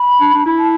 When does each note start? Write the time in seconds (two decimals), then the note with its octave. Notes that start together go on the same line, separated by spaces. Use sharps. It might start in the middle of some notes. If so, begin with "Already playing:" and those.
Already playing: B5
0.21 D4
0.33 D4
0.46 E4
0.58 A5